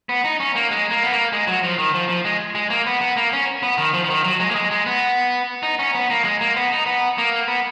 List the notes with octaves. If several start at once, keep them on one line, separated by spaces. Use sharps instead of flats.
B3
D#4
C#4
A#3
G#3
A#3
B3
A#3
G#3
F#3
F3
D#3
F3
F3
G#3
G#3
A#3
B3
B3
A#3
C#4
B3
D#3
F3
F3
D#3
F#3
G#3
A#3
G#3
G#3
B3
D#4
C#4
B3
A#3
G#3
A#3
B3
D#4
B3
A#3
B3